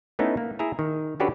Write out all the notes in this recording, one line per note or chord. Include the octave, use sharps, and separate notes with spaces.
A3 B3 C#4 D#4 E4
A#3
E4 G#4 E5 A#5
D#3
C#4 D4 F#4 G4 A4 B4